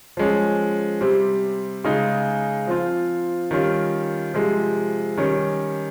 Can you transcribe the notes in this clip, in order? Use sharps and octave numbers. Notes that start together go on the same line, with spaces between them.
F3 G#3 C#4
C3 G3 C4
C#3 G#3 D#4
F3 C4 F4
D#3 G3 C#4 F4
C3 F3 G#3
D#3 G3 C#4